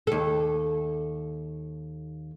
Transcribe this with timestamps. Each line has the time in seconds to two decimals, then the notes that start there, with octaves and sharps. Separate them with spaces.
0.07 D#2 A4